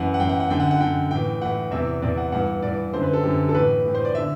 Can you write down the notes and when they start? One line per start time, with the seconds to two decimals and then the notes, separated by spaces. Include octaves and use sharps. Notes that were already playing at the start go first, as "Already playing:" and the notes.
Already playing: F#2 E3 F#5
0.14 F#5
0.20 F#2 E3 G5
0.29 F#5
0.40 F#5
0.50 F#2 D3 G5
0.60 F#5
0.71 F#5
0.81 F#2 D3 G5
1.11 A2 E3 G5
1.41 A2 E3 F#5
1.71 E2 C3 E3 E5
2.02 E2 C3 E3 D5
2.18 F#5
2.32 G2 E3 F#5
2.62 G2 E3 D5
2.93 F#2 D3 C5
3.03 B4
3.13 A4
3.23 F#2 D3 G4
3.49 A4
3.55 A2 E3 B4
3.85 A2 E3
3.95 C5
4.05 D5
4.15 D3 E5